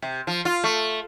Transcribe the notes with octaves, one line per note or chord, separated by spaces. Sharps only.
C3
F3
F4
A3